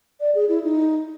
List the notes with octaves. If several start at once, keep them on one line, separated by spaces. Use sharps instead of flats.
D5
G#4
E4
D#4